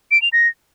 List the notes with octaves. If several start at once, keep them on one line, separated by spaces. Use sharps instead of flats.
D7
F7
A#6